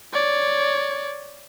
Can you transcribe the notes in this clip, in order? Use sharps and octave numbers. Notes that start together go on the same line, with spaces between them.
C#5 D5